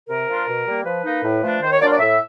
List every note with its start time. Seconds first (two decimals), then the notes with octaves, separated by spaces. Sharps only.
0.09 C3 A#4
0.29 F3 A#3 D4 F4
0.48 B2
0.66 G3 A#3
0.85 F3 B4
1.04 A#3 D#4
1.23 A2
1.42 F3 A3 D4
1.62 D#3 C5
1.71 C#5
1.80 F#3 A#3 D4 F4 D5
1.91 D5
2.00 A2 E5